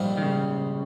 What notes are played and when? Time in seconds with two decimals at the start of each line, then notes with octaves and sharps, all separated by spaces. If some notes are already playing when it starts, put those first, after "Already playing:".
Already playing: A#1 G#2 G3 C4 F4
0.17 D#3
0.22 C#3